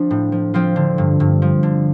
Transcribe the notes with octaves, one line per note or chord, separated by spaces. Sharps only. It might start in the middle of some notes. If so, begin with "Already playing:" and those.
Already playing: F3 C4 D4
A2
F3
F3 C4 F4
D3
G2
G2
F3
D3